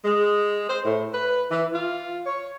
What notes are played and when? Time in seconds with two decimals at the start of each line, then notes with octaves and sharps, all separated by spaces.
0.05 G#3
0.70 C5
0.85 A2
1.14 B4
1.51 E3
1.73 F4
2.26 C#5